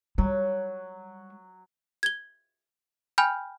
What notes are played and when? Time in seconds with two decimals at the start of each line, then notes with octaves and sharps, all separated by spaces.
0.18 F#3 G3
2.03 G#6 G7
3.18 G5 G#5 B5 F6 G6